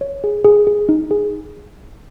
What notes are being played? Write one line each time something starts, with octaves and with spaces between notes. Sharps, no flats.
C#5
G#4
G#4
G#4
D#4
G#4